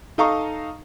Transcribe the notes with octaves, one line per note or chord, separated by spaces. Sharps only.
D#4 A4 D#5 F5 A#5 C#6